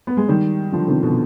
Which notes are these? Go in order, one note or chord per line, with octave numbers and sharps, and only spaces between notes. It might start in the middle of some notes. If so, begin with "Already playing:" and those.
B3
G#3
D#3 G3
D3 F3
C3 D#3
B2 D3